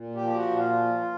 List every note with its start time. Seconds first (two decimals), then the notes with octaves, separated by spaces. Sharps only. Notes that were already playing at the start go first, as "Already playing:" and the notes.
Already playing: A#2
0.15 G4
0.21 F3
0.35 F#4
0.50 A#2
0.56 F4
0.78 F3